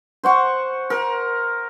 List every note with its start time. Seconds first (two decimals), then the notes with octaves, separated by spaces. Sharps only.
0.23 C5 F#5 C#6
0.90 A#4